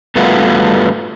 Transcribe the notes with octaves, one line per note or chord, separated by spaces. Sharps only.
G2 A3 B3 F4 F#4